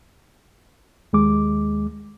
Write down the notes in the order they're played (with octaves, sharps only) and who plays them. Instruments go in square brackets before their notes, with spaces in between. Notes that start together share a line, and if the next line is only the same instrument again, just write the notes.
[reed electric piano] D#2 G#3 D6